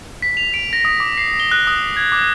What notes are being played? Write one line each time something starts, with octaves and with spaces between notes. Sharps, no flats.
B6
F7
D7
A#6
D#6
D6
C7
G7
F#6
D#6
G#6
D6